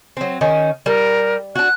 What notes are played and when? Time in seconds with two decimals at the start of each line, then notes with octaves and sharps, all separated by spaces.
0.17 F#3 C4
0.41 D#3 C#4
0.86 G3 A#4
1.55 D4 F#4 F#6